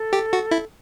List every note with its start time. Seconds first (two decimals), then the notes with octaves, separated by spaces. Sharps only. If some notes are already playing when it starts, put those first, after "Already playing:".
Already playing: A4
0.13 G4
0.33 F#4
0.51 E4